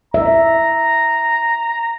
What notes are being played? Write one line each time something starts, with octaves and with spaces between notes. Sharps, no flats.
E5 A#5